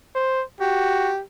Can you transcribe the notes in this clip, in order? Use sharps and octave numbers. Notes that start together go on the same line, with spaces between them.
C5
F#4 G4